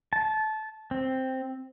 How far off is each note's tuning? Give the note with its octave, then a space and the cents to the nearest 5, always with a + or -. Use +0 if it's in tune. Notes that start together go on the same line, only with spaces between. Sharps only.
A5 -20
C4 +0